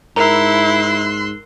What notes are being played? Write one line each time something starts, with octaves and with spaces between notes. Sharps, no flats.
G#2 E4 A#4 A#5 C6 E6 F#6